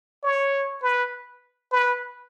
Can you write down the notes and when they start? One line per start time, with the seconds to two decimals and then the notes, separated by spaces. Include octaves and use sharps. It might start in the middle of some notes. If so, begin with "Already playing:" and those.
0.23 C#5
0.82 B4
1.72 B4